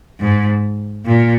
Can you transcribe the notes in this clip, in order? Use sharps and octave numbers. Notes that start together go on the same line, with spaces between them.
G#2
A#2